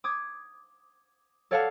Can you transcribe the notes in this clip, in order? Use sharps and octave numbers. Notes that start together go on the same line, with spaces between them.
D6 D#6 G#6
A4 C#5 D5 F5 F#5 A5